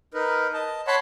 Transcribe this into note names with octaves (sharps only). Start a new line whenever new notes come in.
D#4 A#4 B4
D#5 A5
C#5 F#5 A5 B5 C6